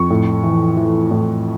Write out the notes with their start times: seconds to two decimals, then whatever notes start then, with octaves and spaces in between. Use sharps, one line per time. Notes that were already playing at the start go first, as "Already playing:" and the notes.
Already playing: F2 C#6
0.10 A2
0.43 E3
0.77 E3
1.11 A2